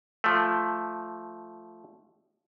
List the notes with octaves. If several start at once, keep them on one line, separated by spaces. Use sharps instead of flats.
F3 A3